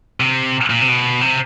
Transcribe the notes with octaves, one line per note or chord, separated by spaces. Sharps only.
C3
A#2
C3
B2
C3